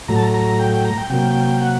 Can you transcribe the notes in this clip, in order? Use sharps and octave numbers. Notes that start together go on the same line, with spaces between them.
A2 F#3 A3 A#5
A5
A#5
A#5
G5
G5
A#5
G5
C3 F#3 A#3 G5
F#5